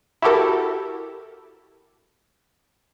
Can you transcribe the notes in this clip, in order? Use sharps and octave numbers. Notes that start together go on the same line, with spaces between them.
E4 F#4 G4 A4 A#4